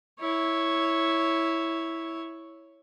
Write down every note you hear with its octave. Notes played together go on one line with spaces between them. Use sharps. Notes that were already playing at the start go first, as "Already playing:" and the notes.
E4 C#5